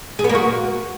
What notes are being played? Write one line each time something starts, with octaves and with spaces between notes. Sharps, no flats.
G#4
B3
A#3
F#4